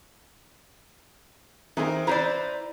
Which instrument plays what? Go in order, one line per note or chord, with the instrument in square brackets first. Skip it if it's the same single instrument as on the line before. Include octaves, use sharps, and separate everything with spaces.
[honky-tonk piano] E3 C4 A#4 [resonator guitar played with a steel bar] D#4
[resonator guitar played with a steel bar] E4 C5 D5 [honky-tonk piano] B4 A#5